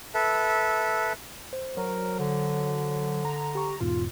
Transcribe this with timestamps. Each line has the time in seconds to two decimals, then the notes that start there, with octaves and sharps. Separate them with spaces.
0.14 A4 B4 E5
1.53 C5
1.77 F#3 A#4
2.19 D3
3.25 A#5
3.55 G4 C#6
3.81 E2 G#2 B2 F4